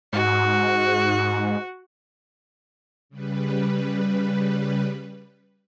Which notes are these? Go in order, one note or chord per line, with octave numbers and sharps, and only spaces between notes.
G#2 F#4
C#3 G3 B4